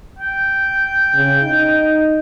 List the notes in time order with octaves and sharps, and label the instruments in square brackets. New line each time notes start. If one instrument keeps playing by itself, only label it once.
[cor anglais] G5
[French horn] C#3
D#4